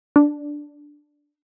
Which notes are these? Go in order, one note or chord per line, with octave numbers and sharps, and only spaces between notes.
D4